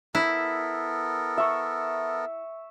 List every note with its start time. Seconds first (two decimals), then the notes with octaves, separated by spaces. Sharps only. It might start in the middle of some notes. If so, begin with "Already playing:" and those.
0.15 B3 E4 A4 A#4
1.38 E5 C#6